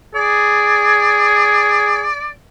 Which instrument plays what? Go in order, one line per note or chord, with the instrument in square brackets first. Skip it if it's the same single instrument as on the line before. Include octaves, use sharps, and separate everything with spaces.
[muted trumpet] G#4 [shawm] D5